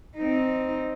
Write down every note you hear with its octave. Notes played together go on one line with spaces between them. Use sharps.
C4 D#4